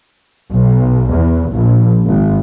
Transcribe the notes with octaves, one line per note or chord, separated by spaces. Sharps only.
B1
E2
A#1
G#1